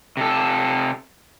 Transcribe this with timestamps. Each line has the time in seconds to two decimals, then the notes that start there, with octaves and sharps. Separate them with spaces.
0.17 C3 A4